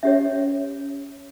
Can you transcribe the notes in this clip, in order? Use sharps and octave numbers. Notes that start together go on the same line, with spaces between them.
C#4 G4 C#5 E5